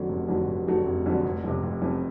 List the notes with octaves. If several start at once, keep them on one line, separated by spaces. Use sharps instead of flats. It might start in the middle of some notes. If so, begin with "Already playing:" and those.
Already playing: F2 D3 F#3 A3
F1
F2 D3 F#3 A3
F1
F2 D3 F#3 A3
F1
F2 D3 F#3 A3
F1
F2 C3
F1
F2 C3